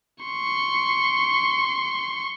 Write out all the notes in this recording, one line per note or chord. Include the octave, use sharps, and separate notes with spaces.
C6 C#6